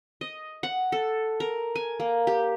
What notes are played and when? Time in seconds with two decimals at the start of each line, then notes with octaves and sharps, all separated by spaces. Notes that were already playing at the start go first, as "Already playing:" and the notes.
0.21 D#5
0.63 F#5
0.92 A4
1.40 A#4
1.76 G#5
2.00 A#3
2.27 G4